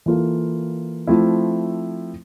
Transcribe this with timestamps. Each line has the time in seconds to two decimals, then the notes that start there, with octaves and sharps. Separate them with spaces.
0.06 E3 A#3 F4 A4
1.07 F3 A3 C4 E4